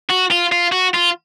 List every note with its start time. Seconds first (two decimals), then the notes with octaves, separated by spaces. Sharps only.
0.09 F#4
0.31 F4
0.52 F4
0.73 F#4
0.94 F4